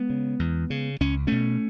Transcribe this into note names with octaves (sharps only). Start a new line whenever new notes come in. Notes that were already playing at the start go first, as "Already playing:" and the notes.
Already playing: G#3 B3
C#3
E2
C#3
C#2 C#4
B2 A3 C#4